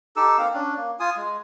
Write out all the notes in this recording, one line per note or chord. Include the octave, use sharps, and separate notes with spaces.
D#4 G4 A4 E6
A#3 C4 F5
C#4 D4
A#3
F4 G#5 D#6
G#3